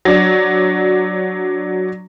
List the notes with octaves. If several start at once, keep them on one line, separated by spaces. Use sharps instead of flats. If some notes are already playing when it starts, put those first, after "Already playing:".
F#3 D4